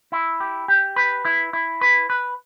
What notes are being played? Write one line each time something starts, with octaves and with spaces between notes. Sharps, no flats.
E4
G4
G4
B4
E4
E4
B4
B4